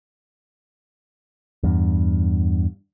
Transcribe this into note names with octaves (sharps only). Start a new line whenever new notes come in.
E2 G2